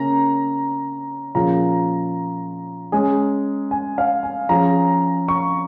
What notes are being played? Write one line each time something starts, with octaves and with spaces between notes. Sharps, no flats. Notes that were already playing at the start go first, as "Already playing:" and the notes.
Already playing: C#3 A#3 C#4 A#5
A#2 F3 C#4 F4 G#4 A#5
G#3 C#4 G#4
G#5
F5
G#5
F3 C#4 F4 G#4 A#5
C#6